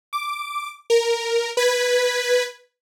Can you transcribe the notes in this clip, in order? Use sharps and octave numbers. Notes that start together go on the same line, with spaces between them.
D6
A#4
B4 G#6 B6